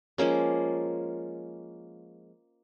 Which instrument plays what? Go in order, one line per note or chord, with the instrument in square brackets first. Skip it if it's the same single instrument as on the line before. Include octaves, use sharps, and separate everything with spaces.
[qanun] F3 G#3 A#3 C#4